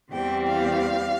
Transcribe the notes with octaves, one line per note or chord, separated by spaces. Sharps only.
E2 E3 G3 C4 G5
F5